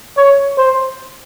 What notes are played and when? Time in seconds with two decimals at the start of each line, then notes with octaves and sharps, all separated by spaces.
0.17 C#5
0.58 C5